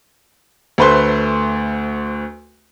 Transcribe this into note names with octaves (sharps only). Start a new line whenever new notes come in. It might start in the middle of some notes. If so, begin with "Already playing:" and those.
D2 A3 B4 C5 C6